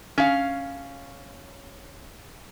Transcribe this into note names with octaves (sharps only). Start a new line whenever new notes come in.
C#4 F5